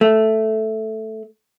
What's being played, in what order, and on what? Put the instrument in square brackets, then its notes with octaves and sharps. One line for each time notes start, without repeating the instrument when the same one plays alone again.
[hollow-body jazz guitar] A3